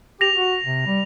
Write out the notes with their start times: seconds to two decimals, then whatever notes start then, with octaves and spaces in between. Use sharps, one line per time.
0.21 G4 A#6 F7
0.35 F#4
0.64 C3
0.86 G3